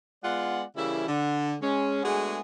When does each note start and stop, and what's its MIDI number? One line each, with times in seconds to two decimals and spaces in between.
0.23 0.63 56
0.23 0.63 59
0.23 0.63 65
0.23 0.63 74
0.23 0.63 78
0.76 1.06 49
0.76 1.06 52
0.76 1.06 55
0.76 1.06 58
0.76 1.06 64
1.08 1.55 50
1.61 2.01 56
1.61 2.01 61
2.04 2.39 56
2.04 2.39 57
2.04 2.39 59
2.04 2.39 62
2.04 2.39 66
2.04 2.39 68